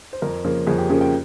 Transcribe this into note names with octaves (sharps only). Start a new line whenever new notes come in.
C5
F2 A#4
C#3 F3 A#3 C#4
F2 G#4
G4
C#3 F3 A#3 C#4 G#4
G5